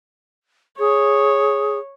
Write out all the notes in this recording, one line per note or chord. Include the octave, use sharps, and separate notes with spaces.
G#4 C#5